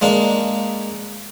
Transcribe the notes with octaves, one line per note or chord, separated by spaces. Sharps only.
G#3 A#3 D4